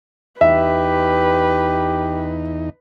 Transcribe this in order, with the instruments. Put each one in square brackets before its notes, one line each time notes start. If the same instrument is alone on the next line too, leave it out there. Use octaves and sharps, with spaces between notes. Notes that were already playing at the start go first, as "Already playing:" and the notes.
[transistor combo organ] E2 D#4 [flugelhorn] G4 [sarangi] B4 [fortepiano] E5